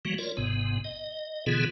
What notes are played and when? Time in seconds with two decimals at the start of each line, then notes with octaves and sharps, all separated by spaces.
0.05 E3 F#3 G3 A#3 F#4
0.18 F4 A#4 C#5 D5
0.37 G#1 G#2 C3 B3
0.84 D#5
1.46 B2 D3 E3 B3 F4 G#4